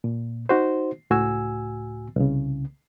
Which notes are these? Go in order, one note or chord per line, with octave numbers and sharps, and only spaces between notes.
A#2
D#4 F#4 C5
C#2 A2 F#4 G#5 E6
C2 C#3